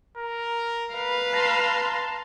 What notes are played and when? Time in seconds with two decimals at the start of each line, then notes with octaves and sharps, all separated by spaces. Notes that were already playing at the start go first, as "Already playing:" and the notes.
0.18 A#4
0.94 B4 F5
1.33 A5 A#5 C6